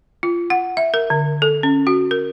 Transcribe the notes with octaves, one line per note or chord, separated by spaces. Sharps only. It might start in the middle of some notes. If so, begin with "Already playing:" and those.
F4
F#5
E5
A#4
D3
A4
C#4
F#4
A#4